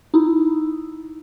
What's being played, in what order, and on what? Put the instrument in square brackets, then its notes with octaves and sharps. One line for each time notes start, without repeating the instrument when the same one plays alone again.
[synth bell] D#4 E4